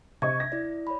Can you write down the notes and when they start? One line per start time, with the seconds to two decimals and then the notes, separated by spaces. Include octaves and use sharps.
0.22 C3 D#5 C#6 G#6
0.40 A#6
0.52 E4 D5
0.87 C#5 D5 B5